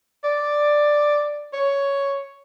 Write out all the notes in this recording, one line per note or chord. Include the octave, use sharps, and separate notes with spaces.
D5
C#5